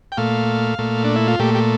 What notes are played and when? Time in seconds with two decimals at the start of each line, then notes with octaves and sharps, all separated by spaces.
0.12 G5
0.17 A#2 A3 F5
0.78 A#2 A3
1.04 D4
1.16 E4
1.28 F4
1.39 A#2 A3 G4
1.55 G4